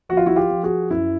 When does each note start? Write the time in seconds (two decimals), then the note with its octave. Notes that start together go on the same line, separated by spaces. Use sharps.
0.09 F3 F#4
0.17 F4
0.26 E4 F#4
0.36 F4 G4
0.50 F3
0.63 F#4 G#4
0.91 F#2 E4